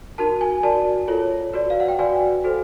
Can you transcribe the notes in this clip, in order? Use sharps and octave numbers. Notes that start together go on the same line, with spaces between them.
D#4 F#4 A#4 A5
G#5
F#4 A#4 D5 A5
F4 A4 C#5
F#4 B4 D5
F5
F#5
G5
F#4 B4 D5 G#5
F#4 A4 C5